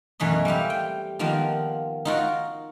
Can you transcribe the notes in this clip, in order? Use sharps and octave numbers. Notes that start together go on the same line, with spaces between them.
F#2 B2 E3 A3 D#5
G3 C4 G4 F5
G5
D#3 F3 A#3 B3 F4
D#4 F4 F#4 A#4